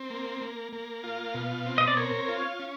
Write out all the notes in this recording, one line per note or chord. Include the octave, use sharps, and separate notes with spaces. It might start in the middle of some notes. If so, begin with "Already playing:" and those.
Already playing: C4
A#3
A#3
A#3
F4
B2
C4
D#5
D5
A#4 C#5
F4
C#4